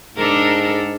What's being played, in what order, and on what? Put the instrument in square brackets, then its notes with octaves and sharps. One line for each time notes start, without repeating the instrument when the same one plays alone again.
[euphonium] G#2 [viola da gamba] D4 A4 A#4